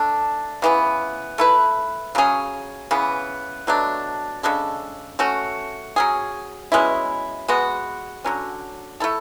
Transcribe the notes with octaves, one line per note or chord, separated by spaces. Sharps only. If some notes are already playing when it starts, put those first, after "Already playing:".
Already playing: D3 A3 D4
C#3 E3 B3
A3 E4 B4
C#3 F#3 C#4 G#4
C#3 E3 B3
B2 F#3 A3 D4
C#3 G#3 D4 A4
A3 C#4 F#4
F#3 C#4 G#4
B2 G#3 C#4 E4
G#3 B3 F#4
D3 F#3 C#4
A3 E4 A4